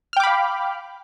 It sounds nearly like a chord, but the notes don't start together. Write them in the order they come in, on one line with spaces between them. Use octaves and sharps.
F6 G5 D6 B5 F5